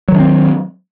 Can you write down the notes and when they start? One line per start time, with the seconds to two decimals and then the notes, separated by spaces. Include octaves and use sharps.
0.08 F#3
0.12 D#3
0.16 D4
0.19 C4